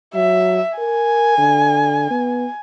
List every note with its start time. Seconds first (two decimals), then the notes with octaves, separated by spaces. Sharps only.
0.15 F#3 E5
0.78 A#4 G#5
1.38 D3
2.11 B3